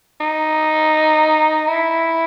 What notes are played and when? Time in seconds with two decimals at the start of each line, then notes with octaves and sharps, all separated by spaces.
0.20 D#4
1.67 E4